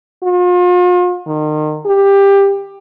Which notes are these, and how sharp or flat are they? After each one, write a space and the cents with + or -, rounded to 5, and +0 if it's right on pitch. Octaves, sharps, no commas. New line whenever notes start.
F4 +40
D#3 -30
G4 +15